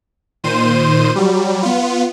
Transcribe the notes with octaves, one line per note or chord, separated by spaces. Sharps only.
A#2 D#3 C5 D#7
F#3 G3
B3 F4